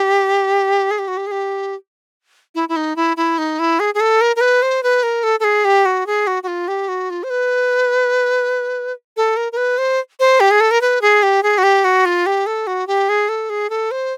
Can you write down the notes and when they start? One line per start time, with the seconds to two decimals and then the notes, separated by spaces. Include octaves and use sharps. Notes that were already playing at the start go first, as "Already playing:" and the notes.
Already playing: G4
0.91 G#4
0.99 G4
1.08 F#4
1.17 G4
1.27 G#4
1.31 G4
2.55 E4
2.69 E4
2.76 D#4
2.96 E4
3.17 E4
3.38 D#4
3.59 E4
3.80 G#4
3.94 G#4
4.00 A4
4.21 A#4
4.36 A#4
4.41 B4
4.62 C5
4.83 B4
5.03 A#4
5.23 A4
5.40 A4
5.44 G#4
5.65 G4
5.85 F#4
6.06 G#4
6.27 F#4
6.43 F#4
6.47 F4
6.68 G4
6.88 F#4
7.10 F4
7.23 C5
7.30 B4
9.17 A4
9.37 A#4
9.52 A#4
9.57 B4
9.78 C5
10.20 C5
10.40 G4
10.51 G#4
10.60 A4
10.71 A#4
10.81 B4
11.01 G#4
11.23 G4
11.43 G#4
11.58 F#4
11.63 G4
11.84 F#4
12.05 F4
12.26 G4
12.46 A4
12.67 F#4
12.87 G4
13.09 G#4
13.29 A4
13.50 G#4
13.70 A4
13.91 C5